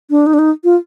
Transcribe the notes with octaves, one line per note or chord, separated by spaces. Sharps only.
D4
D#4
D4
D#4
F4